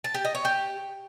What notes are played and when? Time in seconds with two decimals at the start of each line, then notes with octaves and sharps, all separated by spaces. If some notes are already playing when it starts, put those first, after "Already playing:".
0.04 A5
0.14 G4
0.25 D#5
0.35 C#5
0.45 G4